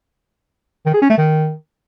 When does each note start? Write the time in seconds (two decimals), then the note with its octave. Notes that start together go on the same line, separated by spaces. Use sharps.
0.86 D#3
0.94 G#4
1.02 C#4
1.10 A3
1.18 D#3